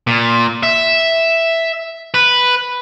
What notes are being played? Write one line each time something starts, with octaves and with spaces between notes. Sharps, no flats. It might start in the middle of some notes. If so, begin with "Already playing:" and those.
A#2
E5
B4